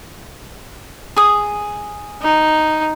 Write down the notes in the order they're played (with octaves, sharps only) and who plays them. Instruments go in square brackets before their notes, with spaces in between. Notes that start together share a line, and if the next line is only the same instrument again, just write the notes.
[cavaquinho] G#4 D#6
[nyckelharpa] D#4